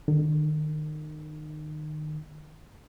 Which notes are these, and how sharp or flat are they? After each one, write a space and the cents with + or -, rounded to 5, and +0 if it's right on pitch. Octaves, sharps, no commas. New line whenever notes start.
D#3 -30